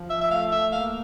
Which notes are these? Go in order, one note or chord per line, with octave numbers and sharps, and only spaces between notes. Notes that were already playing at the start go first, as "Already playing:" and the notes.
Already playing: F3
E5
E5
A3 F5
E5
A#3 F5